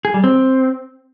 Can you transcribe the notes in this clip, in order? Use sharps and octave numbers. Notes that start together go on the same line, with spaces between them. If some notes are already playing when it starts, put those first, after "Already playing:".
G#4
G3
C4